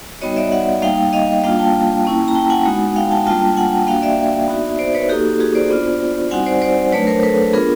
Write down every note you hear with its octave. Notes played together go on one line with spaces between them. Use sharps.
G3 B3 D#4 F#4 C#5 D#5
D5 E5
E5 F#5
G3 A#3 D#4 F5 G5
D#5 F5
G3 A#3 D4 F4 F5 G5
G5 A5
A#3 C#4 E4
A#5
G5 A5
F#5 G#5
G#3 B3 D#4 F#4
F5 G5
G5 A5
G3 A#3 D4 F4 G5 A5
F#5 G#5
A#3 D4 F#4 F5 G5
D5 E5
B3 D#4 F#4
C5 D5
B4 C#5
A#3 D#4 F#4 G4 A4
F#4 G#4
C5 D5
B3 D4 F4
G3 C4 D#4 F#4 F#5 G#5
C5 D5
C5 D5
F#3 A3 D4 B4 C#5
A#4 C5
A4 B4
B3 D4 F4 G#4 A#4